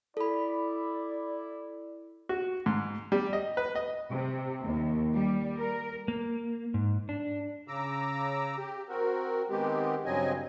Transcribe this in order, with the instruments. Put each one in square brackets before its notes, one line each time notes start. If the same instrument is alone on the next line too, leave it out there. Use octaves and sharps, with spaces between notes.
[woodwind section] E4 [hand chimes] A4 B5 [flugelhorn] D5
[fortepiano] F#4
G#2
G3
D#5
B4
D#5
[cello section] C3
D#2
G3
A#4
[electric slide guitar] A#3
G#2
D4
[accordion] C#3 A#5 D6 E6
G4
C4 F#4 A#4
D#3 G#3 B3 C4 G4
G2 C#3 F#3 C4 D#5 G#5